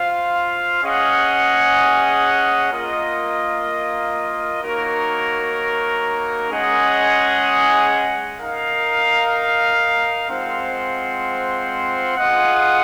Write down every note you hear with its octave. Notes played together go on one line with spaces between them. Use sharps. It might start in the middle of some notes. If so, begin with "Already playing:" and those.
Already playing: F4 C5 F5
C#4 G#4 D#5 F#5
A#3 F4 A#4 D#5
A#3 D#4 F#4 A#4 C#5
G#3 C#4 G#4 D#5 F#5
D#4 A#4 F5
G#3 C4 F4 C5 F#5
F4 G#4 D#5 F#5